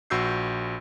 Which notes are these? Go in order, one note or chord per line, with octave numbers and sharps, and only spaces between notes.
A#1 F#4 E6 G6 C7